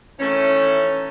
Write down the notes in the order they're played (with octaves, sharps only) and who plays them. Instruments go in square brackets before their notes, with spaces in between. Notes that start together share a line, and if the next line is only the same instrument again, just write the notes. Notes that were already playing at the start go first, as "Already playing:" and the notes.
[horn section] D#3 E3 A3 C#4